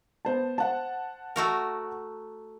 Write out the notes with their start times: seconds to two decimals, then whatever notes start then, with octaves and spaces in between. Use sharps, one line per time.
0.25 B3 C5 A5
0.58 C5 F#5 A5
1.36 A3 F#4 A#4